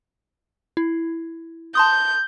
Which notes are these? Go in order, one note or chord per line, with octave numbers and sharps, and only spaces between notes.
E4
A5 C6 D#6 G6